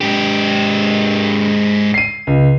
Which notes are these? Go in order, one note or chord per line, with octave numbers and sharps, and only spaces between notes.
G#2 G4
C7 D#7
C#2